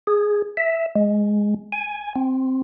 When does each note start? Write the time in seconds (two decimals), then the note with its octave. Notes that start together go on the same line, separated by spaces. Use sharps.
0.07 G#4
0.57 E5
0.96 G#3
1.72 G#5
2.16 C4